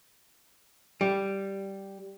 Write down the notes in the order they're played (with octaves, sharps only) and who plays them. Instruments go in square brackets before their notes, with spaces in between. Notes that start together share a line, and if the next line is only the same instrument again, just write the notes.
[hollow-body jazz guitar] G3